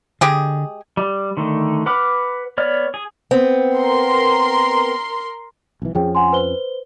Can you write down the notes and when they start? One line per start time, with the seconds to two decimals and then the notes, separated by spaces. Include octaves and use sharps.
0.21 D3 G#3 G4 G#4
0.97 G3
1.37 D3 D#3 A3
1.86 B4 F#5 B5 D6 F6
2.58 B3 C#5 D5 F6
2.94 G#4
3.31 B3 C4
3.77 A#4 C6
5.82 B1 E3
5.95 F2 F3 C#4 G#4 G5
6.15 F#5 G#5 C6
6.32 B4 C5 G7